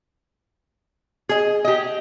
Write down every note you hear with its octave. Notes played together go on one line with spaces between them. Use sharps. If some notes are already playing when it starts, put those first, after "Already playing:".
G#4 D#5
G4 D#5